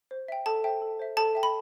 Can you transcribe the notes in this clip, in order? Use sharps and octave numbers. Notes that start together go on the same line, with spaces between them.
C5
E5 G5
A4 A5
C5 E5 G5
A4
C5 E5
A4 A5
E5 G5
B5